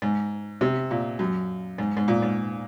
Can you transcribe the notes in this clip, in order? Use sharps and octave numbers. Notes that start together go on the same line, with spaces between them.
G#2
C3
A#2
F#2
G#2
G#2
A#2
G#2